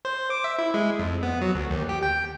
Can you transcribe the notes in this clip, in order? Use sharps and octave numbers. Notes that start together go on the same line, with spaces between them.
C5
D6
E5
E4
G#3
F2
B3
F#3
D2
D#2
G4
G5